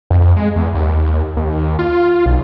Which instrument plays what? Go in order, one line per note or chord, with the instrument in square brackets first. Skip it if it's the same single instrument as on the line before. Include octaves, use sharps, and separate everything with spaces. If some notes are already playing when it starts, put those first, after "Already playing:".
[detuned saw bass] F2
G#3
E2
D#2
D#2
F4
B1